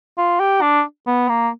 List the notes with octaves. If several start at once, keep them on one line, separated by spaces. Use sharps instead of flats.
F4
G4
D4
B3
A#3